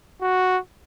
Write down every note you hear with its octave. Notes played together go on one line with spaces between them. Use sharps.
F#4